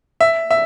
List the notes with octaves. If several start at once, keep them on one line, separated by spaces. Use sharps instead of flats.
E5
E5